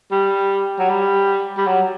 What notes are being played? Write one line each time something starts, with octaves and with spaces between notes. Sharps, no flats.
G3
F#3
G3
G3
F#3